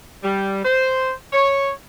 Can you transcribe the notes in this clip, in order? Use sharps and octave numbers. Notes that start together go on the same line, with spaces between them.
G3
C5
C#5